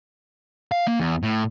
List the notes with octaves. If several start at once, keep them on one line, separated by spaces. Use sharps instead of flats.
F5
A#3
E2
A2